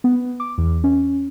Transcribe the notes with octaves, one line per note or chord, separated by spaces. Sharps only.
B3
D6
E2
C#4